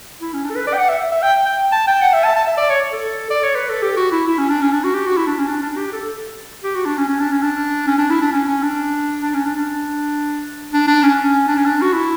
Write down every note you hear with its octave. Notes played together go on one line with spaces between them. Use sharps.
E4
C#4
D4
A4
B4
D5
G5
F#5
E5
E5
G5
G5
A5
G5
F#5
E5
A5
A5
E5
D5
C#5
A4
D5
C#5
B4
A4
G4
F#4
E4
E4
C#4
D4
C#4
D4
F#4
G4
F#4
E4
D4
C#4
D4
D4
G4
A4
G4
F#4
D4
C#4
C#4
D4
C#4
D4
C#4
D4
E4
D4
C#4
C#4
D4
D4
C#4
D4
D4
D4
D4
C#4
C#4
D4
C#4
D4
F#4
E4